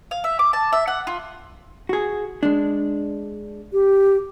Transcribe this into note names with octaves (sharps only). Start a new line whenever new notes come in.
F5
E5
D6
A5
E5
F#5
F4
F#4 G#4
G#3 D4
G4